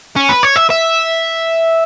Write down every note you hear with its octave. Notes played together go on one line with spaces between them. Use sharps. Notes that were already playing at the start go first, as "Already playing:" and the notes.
C#4
B4
C#5
E5
E5